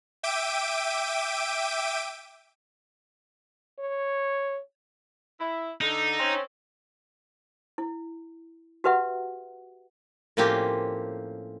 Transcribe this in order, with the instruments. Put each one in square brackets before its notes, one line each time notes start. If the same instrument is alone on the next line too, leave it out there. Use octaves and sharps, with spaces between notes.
[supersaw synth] E5 G5 D6 D7 D#7
[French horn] C#5
[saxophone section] E4
[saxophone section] D3 [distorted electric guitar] D#4
[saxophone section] C4 C#4
[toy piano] E4
F#4 G4 B4 E5 F#5
[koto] A2 F3 A#3 C4 C#4 G4